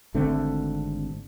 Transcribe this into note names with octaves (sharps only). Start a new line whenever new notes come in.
G#1 D3 A3 C4